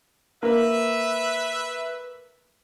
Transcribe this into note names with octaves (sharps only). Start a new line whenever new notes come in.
A#3 B4 E5